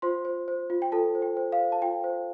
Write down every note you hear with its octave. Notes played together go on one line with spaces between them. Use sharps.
F4 C5 C6
C5
C5
F4
G5
F4 A4 A5
C5
G5
C5
F5
C5
A5
F4 G5
C5